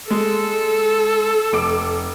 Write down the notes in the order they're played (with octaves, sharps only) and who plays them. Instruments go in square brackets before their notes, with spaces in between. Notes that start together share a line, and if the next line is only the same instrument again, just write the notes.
[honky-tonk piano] G#3 [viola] A4
[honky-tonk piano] F1 D6 D7